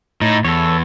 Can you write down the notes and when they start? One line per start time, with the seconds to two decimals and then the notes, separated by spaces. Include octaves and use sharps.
0.21 A2 D#4
0.44 E2 A4 C#5